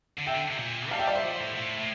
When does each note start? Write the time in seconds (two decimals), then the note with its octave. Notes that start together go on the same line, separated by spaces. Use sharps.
0.19 D3
0.27 C3 E5 G5
0.35 D3
0.51 C3
0.59 A#2
0.91 G3 F5 A5
0.99 E5 G5
1.07 D5 F5
1.15 C5 E5
1.23 F3
1.39 A2
1.55 A2
1.78 A2